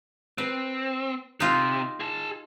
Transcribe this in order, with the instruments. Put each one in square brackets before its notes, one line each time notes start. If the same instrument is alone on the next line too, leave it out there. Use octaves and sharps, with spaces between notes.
[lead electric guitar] C4 [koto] B4
[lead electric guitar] C3 [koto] D#4 F4
[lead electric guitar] G#4 A5